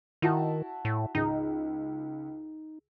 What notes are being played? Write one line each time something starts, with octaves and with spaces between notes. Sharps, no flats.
D#3 E4 F#4 A5
A2
C#2 D#4